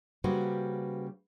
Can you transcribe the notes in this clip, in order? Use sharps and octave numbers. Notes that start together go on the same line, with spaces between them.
C#3 G3 A#3 F#4 B4 C5